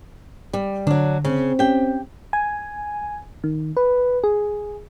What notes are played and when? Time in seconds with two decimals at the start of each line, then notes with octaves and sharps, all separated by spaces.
0.53 G3
0.87 D3 F#3 D4
1.25 C#3 C4
1.59 C#4 G4 G5
2.33 G#5
3.44 D#3
3.77 B4
4.24 G#4